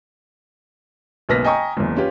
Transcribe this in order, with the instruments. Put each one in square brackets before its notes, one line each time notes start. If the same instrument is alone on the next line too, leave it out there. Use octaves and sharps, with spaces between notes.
[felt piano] F#1 B1 B4 F6 A#6 B6
D#5 G5 G#5 A#5 C#6 D#6
F#1 E2
C#4 F4 G4 B4